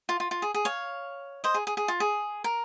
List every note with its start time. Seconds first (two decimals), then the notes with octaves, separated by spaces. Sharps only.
0.09 F4
0.20 F4
0.31 F4
0.42 G#4
0.54 G#4
0.65 C#5 F5
1.44 C5 D#5
1.54 G#4
1.67 G#4
1.77 G#4
1.88 F4
2.00 G#4
2.44 A#4